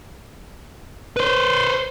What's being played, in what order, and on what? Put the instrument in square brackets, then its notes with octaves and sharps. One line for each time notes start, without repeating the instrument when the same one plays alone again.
[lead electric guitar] B4 C5